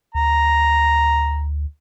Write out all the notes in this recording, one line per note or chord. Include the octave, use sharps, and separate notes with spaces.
D2 A#5